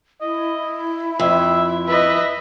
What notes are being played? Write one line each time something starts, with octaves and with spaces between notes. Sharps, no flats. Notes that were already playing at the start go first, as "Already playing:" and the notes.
E4 D#5
F2 E5
B4 D#5 E5